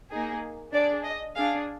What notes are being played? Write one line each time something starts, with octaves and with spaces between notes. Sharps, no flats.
A#3 D#4 G#4
D4 G#4 D5
D#5
D4 G#4 F5